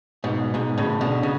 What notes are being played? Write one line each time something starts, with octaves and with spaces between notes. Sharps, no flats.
G#2 B2
G#2 B2
A2 C#3
B2 D3
C#3